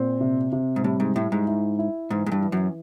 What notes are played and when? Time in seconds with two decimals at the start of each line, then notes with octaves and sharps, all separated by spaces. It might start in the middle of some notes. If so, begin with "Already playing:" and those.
Already playing: A#2 C4
0.21 C3
0.52 C3
0.76 G#2
0.84 A2 G3
1.00 G#2
1.15 A2 E4
1.32 G#2
1.47 E4
1.79 E4
2.10 G#2 E3
2.26 G#2
2.32 G2
2.42 E3
2.52 F#2